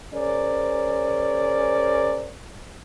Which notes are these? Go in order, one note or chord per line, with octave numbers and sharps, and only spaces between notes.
C#4 G#4 A#4 C5 D5